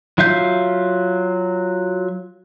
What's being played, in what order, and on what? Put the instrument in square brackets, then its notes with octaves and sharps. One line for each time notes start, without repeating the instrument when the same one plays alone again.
[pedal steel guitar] F#3 F4 E5 F5 G6